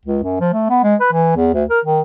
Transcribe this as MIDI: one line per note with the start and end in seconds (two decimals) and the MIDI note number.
0.05 0.22 37
0.23 0.39 42
0.40 0.49 53
0.53 0.66 57
0.69 0.81 59
0.83 0.95 56
1.00 1.09 71
1.13 1.35 52
1.36 1.51 40
1.54 1.64 38
1.70 1.80 70
1.85 2.01 51